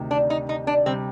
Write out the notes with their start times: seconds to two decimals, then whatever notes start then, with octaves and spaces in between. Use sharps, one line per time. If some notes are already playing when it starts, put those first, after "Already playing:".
Already playing: D2 C3 D#3
0.11 D4
0.30 D#4
0.49 D#4
0.67 D4
0.86 C3 G3 C4